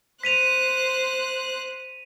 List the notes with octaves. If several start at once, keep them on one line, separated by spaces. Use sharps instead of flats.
C5 F#6 B6 D#7 F7